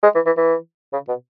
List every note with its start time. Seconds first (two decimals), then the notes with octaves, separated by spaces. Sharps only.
0.03 G#3
0.15 E3
0.26 E3
0.37 E3
0.93 C#3
1.08 B2